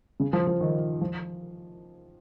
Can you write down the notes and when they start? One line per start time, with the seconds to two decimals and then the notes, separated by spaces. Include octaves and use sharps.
0.20 C#3
0.33 F3
0.47 F3
0.61 D#3
1.01 F3